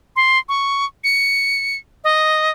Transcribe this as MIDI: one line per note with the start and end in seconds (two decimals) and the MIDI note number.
0.16 0.38 84
0.49 0.85 85
1.04 1.77 97
2.04 2.51 75